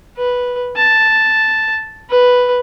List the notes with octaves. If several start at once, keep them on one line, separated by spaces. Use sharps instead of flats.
B4
A5
B4